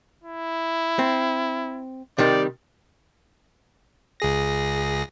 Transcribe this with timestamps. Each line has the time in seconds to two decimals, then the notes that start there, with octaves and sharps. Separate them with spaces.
0.24 E4
0.99 C4
2.18 C3 D#3 G3 D5
4.20 C#2 G#4 A#6